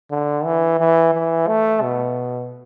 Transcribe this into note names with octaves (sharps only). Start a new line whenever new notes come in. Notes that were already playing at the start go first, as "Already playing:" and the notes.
D3
E3
E3
E3
A3
B2